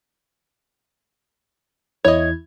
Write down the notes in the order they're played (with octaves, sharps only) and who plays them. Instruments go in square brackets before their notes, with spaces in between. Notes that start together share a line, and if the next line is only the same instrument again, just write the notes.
[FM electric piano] E2 E4 G#6 [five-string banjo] C#5 D#5